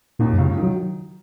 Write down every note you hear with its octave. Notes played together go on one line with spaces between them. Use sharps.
D#2 A#2 D#3
F#2
C#2 C#3
D#3 F#3